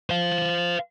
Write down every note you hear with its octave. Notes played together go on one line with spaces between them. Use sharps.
C5 F5